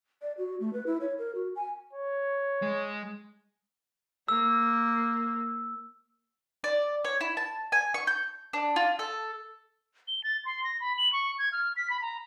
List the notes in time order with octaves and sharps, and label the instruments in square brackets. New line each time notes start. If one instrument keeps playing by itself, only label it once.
[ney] D5
F#4
A3
B4
E4
C#5
A#4
F#4
G#5
[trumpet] C#5
[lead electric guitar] G#3
[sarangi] A#3 [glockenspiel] E6
[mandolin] D5
C#5
E4
A5
G#5
C#6
G6
D4
F4
A4
[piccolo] G7
A6
C6
A#6
B5
F#7
C#6
G#6
F6
B6
B5
A#5